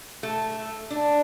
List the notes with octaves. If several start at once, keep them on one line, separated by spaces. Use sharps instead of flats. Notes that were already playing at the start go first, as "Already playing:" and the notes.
A3
D4